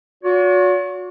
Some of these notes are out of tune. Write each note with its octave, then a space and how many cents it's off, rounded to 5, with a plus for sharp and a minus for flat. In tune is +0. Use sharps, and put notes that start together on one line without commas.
F#4 -40 C#5 +45